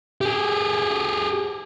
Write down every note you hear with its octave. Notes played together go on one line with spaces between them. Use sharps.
G4 G#4